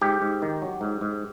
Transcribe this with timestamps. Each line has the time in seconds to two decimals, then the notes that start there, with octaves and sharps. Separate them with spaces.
0.01 G#2 G4
0.22 G#2
0.42 D#3
0.62 F#3
0.81 G#2
1.01 G#2